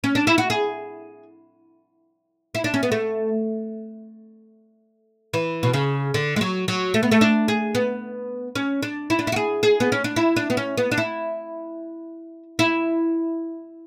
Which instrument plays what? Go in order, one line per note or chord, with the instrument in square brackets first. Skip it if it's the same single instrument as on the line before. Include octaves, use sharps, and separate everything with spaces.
[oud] C#4
D4
E4
F#4
G#4
E4
D4
C#4
B3
A3
E3
B2
C#3
D3
G#3
F#3
F#3
A3
B3
A3
D4
G#4
B3
C#4
D4
E4
D4
E4
F#4
G#4
G#4
B3
C#4
D4
E4
D4
B3
C#4
B3
D4
E4
E4